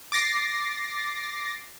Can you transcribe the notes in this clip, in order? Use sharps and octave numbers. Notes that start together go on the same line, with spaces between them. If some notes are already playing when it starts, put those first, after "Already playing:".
D6 A6 A#6 C7